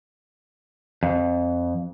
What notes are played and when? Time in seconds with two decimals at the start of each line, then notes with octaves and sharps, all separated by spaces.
1.03 F2